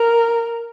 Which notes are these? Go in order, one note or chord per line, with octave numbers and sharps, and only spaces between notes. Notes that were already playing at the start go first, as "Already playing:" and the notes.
Already playing: A#4